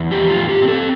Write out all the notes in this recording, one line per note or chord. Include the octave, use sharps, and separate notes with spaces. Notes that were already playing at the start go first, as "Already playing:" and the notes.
Already playing: E2
F3 G4
F4
A2
G4
C4
A4